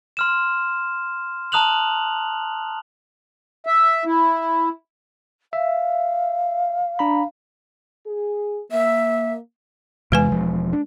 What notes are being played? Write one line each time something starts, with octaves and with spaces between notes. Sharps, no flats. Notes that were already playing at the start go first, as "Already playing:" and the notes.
C6 F6 E7
A5 A#5 D#6 F#6 F7 F#7
E5
E4
E5 F5
D4 A#5 B5
G#4
A#3 E5
E2 C3 E3 G#3 B4 G#5
E1 F3
D4